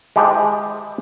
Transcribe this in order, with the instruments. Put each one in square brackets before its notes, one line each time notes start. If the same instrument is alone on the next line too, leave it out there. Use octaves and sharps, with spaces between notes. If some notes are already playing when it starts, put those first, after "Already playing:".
[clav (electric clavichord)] G#3 E4 G4 A4 C5 D#5